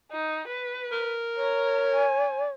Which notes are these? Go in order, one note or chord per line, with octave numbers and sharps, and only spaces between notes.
D#4
B4
A#4
C#5 A#5
G#5